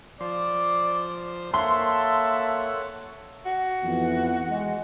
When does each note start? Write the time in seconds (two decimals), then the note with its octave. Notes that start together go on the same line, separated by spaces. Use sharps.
0.21 F3 C5 D5
1.54 A#3 A4 C#5 E5 F#5 A5 C6
3.46 F#4
3.83 F2 E3 B3
4.48 G#3